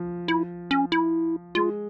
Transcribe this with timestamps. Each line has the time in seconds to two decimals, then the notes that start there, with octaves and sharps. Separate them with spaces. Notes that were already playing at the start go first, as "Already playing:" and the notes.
Already playing: F3
0.28 E4
0.71 C#4
0.92 E4
1.55 G#3 F4